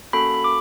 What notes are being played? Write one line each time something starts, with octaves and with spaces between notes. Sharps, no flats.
A#3 C#4 F#4 A4 B5
B5
D6